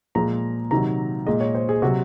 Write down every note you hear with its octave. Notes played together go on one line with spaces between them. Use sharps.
A#2 F3 G#3 A#5
C3 D#3 F#3 A#5
A#2 G#3 D#5
C#5
C5
G#4
C3 F#3 F#4